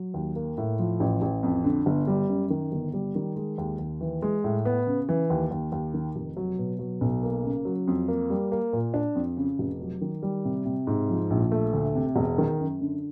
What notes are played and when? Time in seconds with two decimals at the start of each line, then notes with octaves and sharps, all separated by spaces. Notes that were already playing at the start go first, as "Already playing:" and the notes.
Already playing: F#3
0.14 D#2
0.36 A#3
0.58 A2
0.79 F3
1.00 A1
1.22 A1
1.43 F2
1.64 D3
1.86 G1
2.07 G3
2.28 F#2
2.50 D#3
2.72 G1
2.93 G3
3.15 D#3
3.36 G#3
3.58 D#2
3.79 D#2
4.01 E3
4.22 G#3
4.44 A2
4.65 B3
4.87 C#3
5.09 E3
5.30 D#2
5.51 D#2
5.72 D#2
5.94 D#3
6.16 F1
6.37 F#3
6.59 B2
6.79 F#3
7.01 B1
7.23 A#3
7.44 C#3
7.65 F#3
7.87 F2
8.08 A#3
8.30 G3
8.52 A#3
8.73 A#2
8.94 D4
9.15 F2
9.37 C#3
9.59 F1
9.80 F#3
10.01 D#3
10.22 G3
10.45 C3
10.65 C3
10.87 G#2
11.10 F3
11.30 A#1
11.52 A3
11.73 D2
11.95 C3
12.16 E1
12.38 D#3
12.59 F#2
12.81 D3